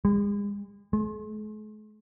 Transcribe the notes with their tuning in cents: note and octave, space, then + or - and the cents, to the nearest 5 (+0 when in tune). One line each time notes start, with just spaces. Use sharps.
G#3 -40
G#3 +45